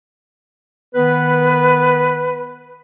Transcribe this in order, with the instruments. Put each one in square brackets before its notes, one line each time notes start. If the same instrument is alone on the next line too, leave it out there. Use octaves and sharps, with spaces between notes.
[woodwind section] D#3 B3 B4